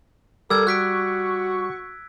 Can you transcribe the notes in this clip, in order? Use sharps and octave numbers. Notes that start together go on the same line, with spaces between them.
G3 A4 A#4 E6 G#6
F#4 C#6 F#6 B6 D7